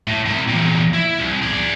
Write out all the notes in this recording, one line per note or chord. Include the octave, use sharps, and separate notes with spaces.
A2
C3 E4
E2 A#2
E4
C2
G#4 D5